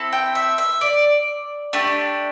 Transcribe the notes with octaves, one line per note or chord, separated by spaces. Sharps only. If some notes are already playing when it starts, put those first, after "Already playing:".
Already playing: C4 E4 A4
G5
E5
E5
D5
A3 D4 G4